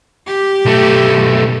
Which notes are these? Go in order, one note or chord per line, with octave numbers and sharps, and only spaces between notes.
G4
B1 A3